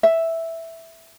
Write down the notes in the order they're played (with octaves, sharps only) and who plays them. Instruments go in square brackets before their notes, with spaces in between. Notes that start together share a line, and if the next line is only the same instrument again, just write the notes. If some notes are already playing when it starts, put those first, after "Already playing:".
[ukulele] E5